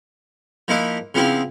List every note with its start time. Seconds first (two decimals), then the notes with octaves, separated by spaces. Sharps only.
0.68 F3 A#3 D#4 E4 B4
1.15 C#3 F3 B3 C4 E4 F4